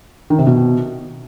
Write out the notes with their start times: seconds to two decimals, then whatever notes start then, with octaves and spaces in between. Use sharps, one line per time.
0.30 D#3
0.39 C3
0.47 B2